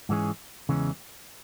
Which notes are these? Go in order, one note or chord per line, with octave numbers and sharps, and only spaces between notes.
G#2 E3 G#3 C#4 G#4
E2 C#3 E3 G#3 C#4